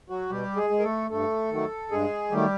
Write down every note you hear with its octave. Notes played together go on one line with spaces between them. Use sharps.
F#3 F#4
B2 G3 G4
G#3 G#4
G#3
A#4
A3 A4
G2 A3 A4
D#3 F#3 A3
G2 G#3 G#4
D#3 F#3 G3 A3 G4